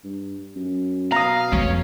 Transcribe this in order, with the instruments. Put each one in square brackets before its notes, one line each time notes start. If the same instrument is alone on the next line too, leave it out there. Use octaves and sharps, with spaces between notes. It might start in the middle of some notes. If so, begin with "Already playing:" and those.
[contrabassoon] G2
F#2
[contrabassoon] B2 [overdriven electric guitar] F5 [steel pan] A#5 D#6
[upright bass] F2 [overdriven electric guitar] C#4